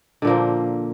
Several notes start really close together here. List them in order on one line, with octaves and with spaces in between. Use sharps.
D3 A#2 A#3 F3